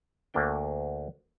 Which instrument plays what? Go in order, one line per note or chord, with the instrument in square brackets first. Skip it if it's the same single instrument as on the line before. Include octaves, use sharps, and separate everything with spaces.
[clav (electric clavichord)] D2 A3 A#3 D4 G5